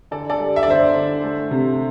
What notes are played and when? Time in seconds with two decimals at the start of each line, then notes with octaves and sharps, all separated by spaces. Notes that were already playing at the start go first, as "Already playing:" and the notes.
0.11 D3 A4 D5
0.30 A4 D5
0.39 G3
0.56 E5
0.63 D5
0.67 D3 C5 E5
0.95 D3
1.23 A3
1.51 C3